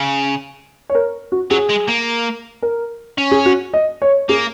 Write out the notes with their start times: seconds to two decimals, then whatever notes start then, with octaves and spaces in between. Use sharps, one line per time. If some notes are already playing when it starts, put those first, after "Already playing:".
Already playing: C#3
0.90 C#5
0.95 A#4
1.32 F#4
1.51 F#3 G#4
1.69 G#3
1.88 A#3
2.62 A#4
3.18 C#4
3.32 G#4
3.46 F#4
3.74 D#5
4.02 C#5
4.29 A#3 G#4